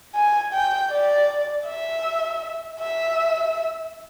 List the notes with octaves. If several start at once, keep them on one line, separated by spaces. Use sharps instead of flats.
G#5
G5
D5
E5
E5